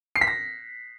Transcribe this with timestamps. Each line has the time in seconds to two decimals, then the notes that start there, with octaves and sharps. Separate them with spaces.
0.16 C7
0.21 B6
0.27 A#6